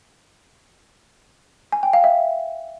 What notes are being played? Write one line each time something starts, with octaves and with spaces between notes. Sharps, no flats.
G#5
G5
F5
E5